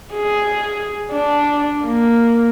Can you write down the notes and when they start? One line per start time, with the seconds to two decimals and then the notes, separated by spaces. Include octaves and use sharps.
0.15 G#4
1.12 D4
1.85 A#3